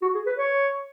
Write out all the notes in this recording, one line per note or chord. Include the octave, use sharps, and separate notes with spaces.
F#4
G#4
B4
C#5